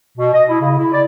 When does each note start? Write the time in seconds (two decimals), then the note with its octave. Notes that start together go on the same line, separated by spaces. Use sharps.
0.17 B2
0.33 D#5
0.48 E4
0.61 C#3
0.77 E4
0.91 D5